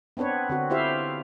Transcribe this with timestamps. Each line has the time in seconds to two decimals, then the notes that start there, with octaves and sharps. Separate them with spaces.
0.17 B3 C4 D4 B4 C#5
0.49 D3 C4 F#4
0.70 E4 F4 G4 C5 E5 F5